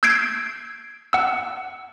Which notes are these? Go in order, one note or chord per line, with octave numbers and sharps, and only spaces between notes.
E6 G6 G#6 C7 D7
F#5 E6